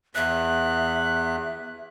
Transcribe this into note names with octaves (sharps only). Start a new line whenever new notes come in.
E2 E5 F#6